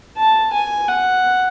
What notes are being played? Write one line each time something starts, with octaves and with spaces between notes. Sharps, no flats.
A5
G#5
F#5